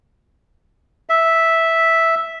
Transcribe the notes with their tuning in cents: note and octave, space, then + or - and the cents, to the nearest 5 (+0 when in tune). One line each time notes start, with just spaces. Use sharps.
E5 -5